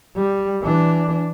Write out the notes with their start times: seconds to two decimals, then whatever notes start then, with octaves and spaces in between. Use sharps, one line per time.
0.16 G3
0.62 E3 D4